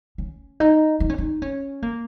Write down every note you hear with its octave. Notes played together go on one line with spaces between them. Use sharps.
C#4
D#4
D#4
C#4
D#4
C#4
A#3